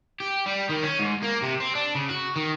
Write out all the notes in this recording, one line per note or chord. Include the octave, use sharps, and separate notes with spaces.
G4
G3
D#3
C#4
G#2
A#3
C3
C4
D4
C#3
F#4
D#3